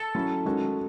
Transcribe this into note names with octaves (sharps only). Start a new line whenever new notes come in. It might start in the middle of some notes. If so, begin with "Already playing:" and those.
Already playing: A4
F#3 C#4 E4
D#3 G#3 C#4 F#4